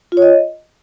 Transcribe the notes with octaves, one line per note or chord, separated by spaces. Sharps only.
F4
C#5
D#5